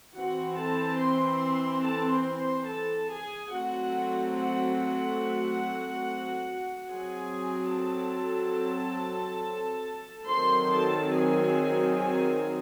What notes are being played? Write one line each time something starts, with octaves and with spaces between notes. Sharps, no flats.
E3 C4 F#4 F#5
A4 A5
C5 C6
A4 A5
C5 C6
C5 C6
A4 A5
G#4 G#5
F#3 A3 C4 F#4 F#5
F#4 F#5
F#4 F#5
F#3 C4 G#4 G#5
A4 A5
D#3 F#3 C4 C5 C6
A4 A5
G#4 G#5
G#4 G#5